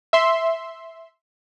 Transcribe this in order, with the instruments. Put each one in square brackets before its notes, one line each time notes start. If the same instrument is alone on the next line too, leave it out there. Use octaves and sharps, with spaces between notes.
[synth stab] E5 C6